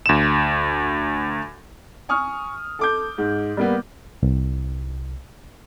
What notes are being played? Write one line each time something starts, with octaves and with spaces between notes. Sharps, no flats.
D2 E7
G#5 C#6 D#6 F6
A4 D6 G6
G#2
G3 A#3 B3
C2